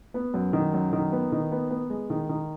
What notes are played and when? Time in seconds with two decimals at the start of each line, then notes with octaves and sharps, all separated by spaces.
0.14 B3
0.34 F#2
0.53 D#3
0.73 F#2
0.93 D#3
1.12 B3
1.32 D#3
1.52 B3
1.71 B3
1.90 G#3
2.10 D#3
2.29 D#3